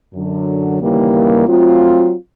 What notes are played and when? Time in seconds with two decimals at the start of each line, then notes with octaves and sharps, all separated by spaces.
0.14 F#2 D3 F#3
0.81 D#2 C#3 E3 G3 A#3
1.47 F#3 A3 C4 F4